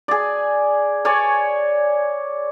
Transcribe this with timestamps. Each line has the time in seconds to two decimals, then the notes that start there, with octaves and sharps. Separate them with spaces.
0.08 G#4 D5
1.05 C#5 D5 G#5 C#6